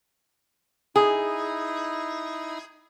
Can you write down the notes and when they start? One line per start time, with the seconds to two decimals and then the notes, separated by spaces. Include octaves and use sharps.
0.96 D#4 E4 G#4